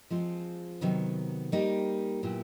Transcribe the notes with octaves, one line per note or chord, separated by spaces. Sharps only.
F3 G#3 C4 F4
C3 D#3 F#3 B3
G3 A#3 D#4 G4
A#2 F#3 B3 E4 G4